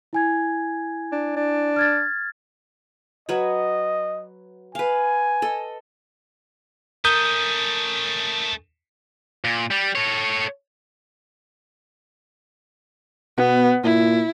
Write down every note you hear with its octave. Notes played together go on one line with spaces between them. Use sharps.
E4 G#5 G#6
D4
D4
F6 G#6 A6
F#3 B4 C#5 D#5
B4 F5 G#5
A4 D#5
A3 C#4 A#4 D#6 G6
A#2
G3
A4 C#5
B2 B3
A#2 E4